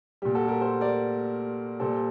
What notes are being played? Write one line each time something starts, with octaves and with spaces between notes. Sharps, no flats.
A#2 G3 G4
F#4 A4
G4 A#4
A4 C5
A#4 D5
A#2 G3 A4 C5